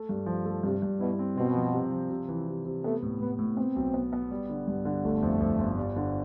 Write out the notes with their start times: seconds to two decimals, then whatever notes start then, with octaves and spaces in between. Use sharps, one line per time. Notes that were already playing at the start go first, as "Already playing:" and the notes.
Already playing: A3
0.09 G2
0.26 F3
0.45 A3
0.63 G2 C3
0.82 G2
1.00 B2 E4
1.19 C4
1.37 B2 C4
1.55 F3
1.74 C3
1.92 F3
2.11 C3
2.28 E3
2.48 C3
2.65 C3
2.84 A3 B3
3.02 A2
3.20 A2 B3
3.38 A2
3.57 B3 C4
3.76 B1
3.94 B3
4.13 B3
4.31 G3
4.49 D3
4.68 G2
4.85 D3
5.04 G1 A3
5.22 F2
5.40 F2
5.58 G1
5.78 G3
5.96 D3